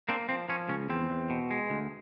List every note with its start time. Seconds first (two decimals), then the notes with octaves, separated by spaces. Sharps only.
0.09 A#3 C4 D4
0.29 F3 C4
0.49 F3 C#4
0.69 C#2 C#4
0.89 E2 C4
1.10 E2
1.30 B2
1.51 G#3
1.70 D2